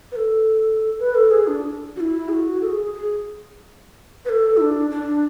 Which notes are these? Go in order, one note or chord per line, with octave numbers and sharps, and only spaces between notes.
B4
A4
B4
A4
G#4
D4
F#4
E4
G#4
F#4
A4
G#4
G#4
B4
A4
E4
D4
D4